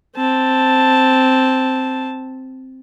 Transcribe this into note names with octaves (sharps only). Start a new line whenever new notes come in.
C4 A5